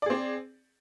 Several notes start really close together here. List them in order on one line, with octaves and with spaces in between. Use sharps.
D5 G#4 C4